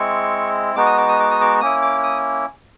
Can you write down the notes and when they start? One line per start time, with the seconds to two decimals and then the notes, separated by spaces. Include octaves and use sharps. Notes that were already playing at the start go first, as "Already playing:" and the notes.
Already playing: G#3 C4 E4 C#6
0.75 G#3 B3 D#4 F#4 D6
0.86 D#6
0.98 D6
1.08 D#6
1.20 D6
1.31 D#6
1.41 D6
1.61 A#3 C#4 E4 D#6
1.82 D6
2.03 D#6